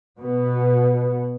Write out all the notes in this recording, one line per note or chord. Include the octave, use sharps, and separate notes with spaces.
B2 B3